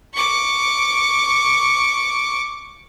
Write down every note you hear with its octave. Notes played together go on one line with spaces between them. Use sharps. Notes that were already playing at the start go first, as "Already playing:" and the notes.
C#6 D6